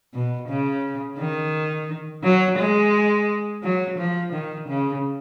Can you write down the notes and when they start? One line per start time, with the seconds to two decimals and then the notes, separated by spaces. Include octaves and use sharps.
0.14 B2
0.49 C#3
1.19 D#3
2.24 F#3
2.59 G#3
3.63 F#3
3.98 F3
4.33 D#3
4.69 C#3